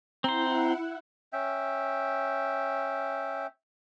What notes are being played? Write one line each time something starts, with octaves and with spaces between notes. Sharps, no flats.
C4 E4 C5 F#5 A#5
C#4 E5 G5